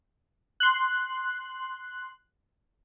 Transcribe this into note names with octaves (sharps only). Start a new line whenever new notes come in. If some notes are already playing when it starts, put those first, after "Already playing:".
C6 F#6